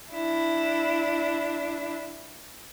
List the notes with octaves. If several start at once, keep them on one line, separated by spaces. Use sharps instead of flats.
D4 E4